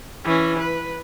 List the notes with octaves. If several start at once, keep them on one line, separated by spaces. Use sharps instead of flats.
E3 C#4
B4